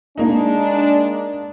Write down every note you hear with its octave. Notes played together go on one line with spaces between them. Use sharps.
G#3 A#3 D4 D#4